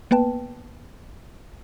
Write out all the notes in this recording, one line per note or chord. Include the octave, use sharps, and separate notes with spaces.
A#3 B3 B4 G5 A5